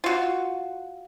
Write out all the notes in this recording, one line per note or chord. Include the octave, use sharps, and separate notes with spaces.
F4 F#4